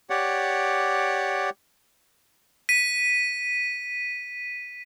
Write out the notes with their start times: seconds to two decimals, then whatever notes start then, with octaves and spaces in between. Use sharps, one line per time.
0.10 G4 C#5 D5 F#5
2.69 B6 D#7